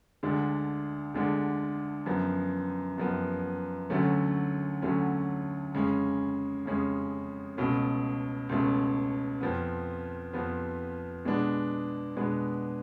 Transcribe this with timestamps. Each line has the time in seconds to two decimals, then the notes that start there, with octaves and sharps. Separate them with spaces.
0.23 D2 D3 G#3 D4
1.14 D2 D3 G#3 D4
2.06 F#2 F3 B3
2.98 F#2 F3 B3
3.90 D2 D3 F#3 A3 C#4
4.82 D2 D3 F#3 A3 C#4
5.74 F2 C#3 G#3 C#4
6.66 F2 C#3 G#3 C#4
7.57 C#2 B2 A3 C#4
8.49 C#2 B2 A3 C#4
9.41 F2 F3 B3
10.33 F2 F3 B3
11.25 B2 G#3 B3 D4
12.17 B2 G#3 B3 D4